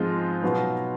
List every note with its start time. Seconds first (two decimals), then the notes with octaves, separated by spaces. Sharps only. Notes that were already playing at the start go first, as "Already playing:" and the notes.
Already playing: G#2 F3 G#3 C4 D#4 F4
0.43 B2 F#3 B3